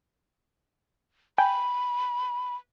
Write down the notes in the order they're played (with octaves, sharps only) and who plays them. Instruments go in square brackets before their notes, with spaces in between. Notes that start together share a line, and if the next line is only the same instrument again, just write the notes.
[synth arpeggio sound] G5 G#5 [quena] B5